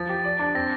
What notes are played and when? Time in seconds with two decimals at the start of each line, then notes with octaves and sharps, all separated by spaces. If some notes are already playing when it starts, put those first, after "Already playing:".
Already playing: F3 A6
0.09 G4
0.24 D5
0.39 D4
0.55 C4 A#6